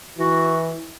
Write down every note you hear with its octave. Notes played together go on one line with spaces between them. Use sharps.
E3 F#4